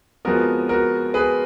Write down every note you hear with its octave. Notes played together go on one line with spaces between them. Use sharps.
F2 F3 G#3 B3 F#4 A#4
F#4 A#4
G#4 B4